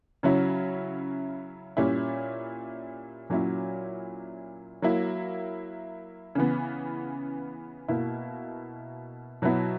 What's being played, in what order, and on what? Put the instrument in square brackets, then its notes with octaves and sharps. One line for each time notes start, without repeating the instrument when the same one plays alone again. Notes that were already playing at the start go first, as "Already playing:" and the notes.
[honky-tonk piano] C#3 F#3 C#4 E4
A#2 G3 C#4 E4
A#2 F#3 C#4 E4
F#3 A#3 E4
C#3 E3 B3
B2 A#3 E4
B2 F#3 B3 E4